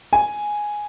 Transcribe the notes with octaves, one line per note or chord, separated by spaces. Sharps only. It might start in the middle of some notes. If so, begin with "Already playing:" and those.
G#5